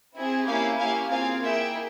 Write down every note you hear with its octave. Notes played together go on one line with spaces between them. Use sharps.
C4 E4 G#4
A#3 C#4 E4 G4 F5 G#5
A#3 C#4 E4 G4 F5 G#5
C4 F4 G#4 F5 G#5
A#3 E4 G#4 E5 G5